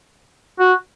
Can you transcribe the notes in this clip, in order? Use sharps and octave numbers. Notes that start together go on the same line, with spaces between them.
F#4